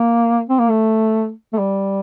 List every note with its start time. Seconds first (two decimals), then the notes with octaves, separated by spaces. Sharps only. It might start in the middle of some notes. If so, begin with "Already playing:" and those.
Already playing: A#3
0.49 C4
0.59 A#3
0.70 A3
1.53 A3
1.58 G3